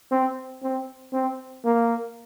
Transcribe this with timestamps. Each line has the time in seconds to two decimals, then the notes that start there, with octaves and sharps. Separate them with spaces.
0.11 C4
0.63 C4
1.13 C4
1.64 A#3